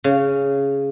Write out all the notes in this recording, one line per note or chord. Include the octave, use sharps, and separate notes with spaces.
C#3